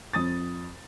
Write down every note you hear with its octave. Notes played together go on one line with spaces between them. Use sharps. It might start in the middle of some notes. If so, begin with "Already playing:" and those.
F2 D#6 A6